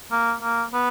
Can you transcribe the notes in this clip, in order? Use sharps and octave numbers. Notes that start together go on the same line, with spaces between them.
A#3
A#3
B3